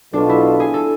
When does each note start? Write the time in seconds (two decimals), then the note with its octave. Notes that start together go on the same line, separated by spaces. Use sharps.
0.13 B1 B2 B3 D4 F4 A4
0.29 E4
0.60 G#4
0.74 A4